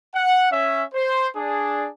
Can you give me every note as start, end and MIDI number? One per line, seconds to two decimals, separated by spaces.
0.15 0.50 78
0.51 0.84 61
0.51 0.84 76
0.94 1.27 72
1.36 1.88 62
1.36 1.88 68